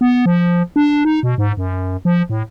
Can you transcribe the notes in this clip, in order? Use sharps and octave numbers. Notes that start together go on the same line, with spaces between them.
B3
F3
D4
D#4
B2
G#2
F#2
F3
A2